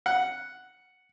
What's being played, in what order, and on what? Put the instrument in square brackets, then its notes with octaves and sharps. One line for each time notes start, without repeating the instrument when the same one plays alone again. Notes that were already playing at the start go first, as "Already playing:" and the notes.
[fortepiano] F#5